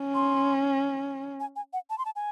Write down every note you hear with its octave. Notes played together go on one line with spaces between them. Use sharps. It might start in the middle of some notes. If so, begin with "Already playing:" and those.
Already playing: C#4
C6
G#5
G#5
F#5
A5
C6
A5
G#5